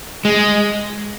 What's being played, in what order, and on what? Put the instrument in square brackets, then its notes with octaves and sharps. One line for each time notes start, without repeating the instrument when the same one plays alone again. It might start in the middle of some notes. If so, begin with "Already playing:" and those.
[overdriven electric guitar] G#3